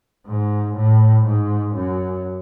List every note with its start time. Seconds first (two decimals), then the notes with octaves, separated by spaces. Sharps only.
0.26 G#2
0.76 A2
1.25 G#2
1.75 F#2